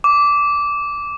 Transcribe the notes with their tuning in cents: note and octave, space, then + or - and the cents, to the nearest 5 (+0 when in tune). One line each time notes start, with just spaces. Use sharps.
D6 -15